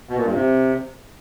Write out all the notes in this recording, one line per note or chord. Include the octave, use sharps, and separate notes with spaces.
B2
A#2
G2
C3